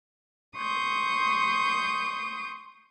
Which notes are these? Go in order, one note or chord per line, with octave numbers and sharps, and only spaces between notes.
C6 C#6 D#6 G6